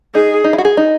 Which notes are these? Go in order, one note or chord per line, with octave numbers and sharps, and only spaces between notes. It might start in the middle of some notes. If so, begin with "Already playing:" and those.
D#4 G#4
D#4
E4
F#4
G#4
D#4